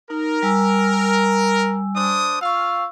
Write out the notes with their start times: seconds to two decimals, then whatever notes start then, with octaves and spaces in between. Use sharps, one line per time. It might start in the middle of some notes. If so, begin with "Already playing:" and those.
0.10 D#4 A#4
0.43 G3 G#5 E6
1.96 D4 C5 D#6
2.41 F4 F5 C#6 E6